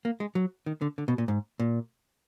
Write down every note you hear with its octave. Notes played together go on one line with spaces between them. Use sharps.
A#3
G#3
F#3
D#3
D3
D3
B2
A#2
G#2
A#2